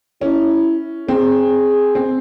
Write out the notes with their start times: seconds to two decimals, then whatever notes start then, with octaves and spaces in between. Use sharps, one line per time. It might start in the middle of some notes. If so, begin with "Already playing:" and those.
0.21 C#4 E4
1.08 C4 G#4
1.95 C4